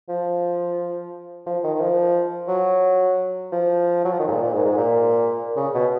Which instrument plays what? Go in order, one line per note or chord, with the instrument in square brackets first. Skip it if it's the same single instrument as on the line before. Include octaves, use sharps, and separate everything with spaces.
[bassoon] F3
F3
D#3
D#3
F3
F#3
F3
F#3
F3
D#3
G#2
A#2
A#2
G#2
G#2
A#2
C#3
B2